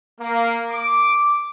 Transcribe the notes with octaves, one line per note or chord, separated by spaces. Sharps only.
A#3
D6